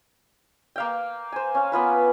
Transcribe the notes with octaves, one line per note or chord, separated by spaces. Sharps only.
A#3 F5 G5
C5 G#5
C#4 F5
A#3 B3 F4 B4